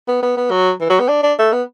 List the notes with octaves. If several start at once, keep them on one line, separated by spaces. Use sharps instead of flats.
B3
B3
B3
F#3
E3
F#3
B3
D4
D4
A3
B3